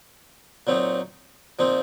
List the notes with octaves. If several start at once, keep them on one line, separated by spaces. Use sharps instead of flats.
A#2 F#3 C4 D#4
A#2 F3 C4 D#4